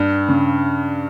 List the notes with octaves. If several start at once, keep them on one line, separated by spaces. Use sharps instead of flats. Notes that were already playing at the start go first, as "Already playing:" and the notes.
Already playing: G2
C#3